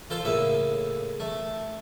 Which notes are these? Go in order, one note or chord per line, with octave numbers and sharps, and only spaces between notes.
F4 A4 C5
A2 C#3 A#3 E5
A3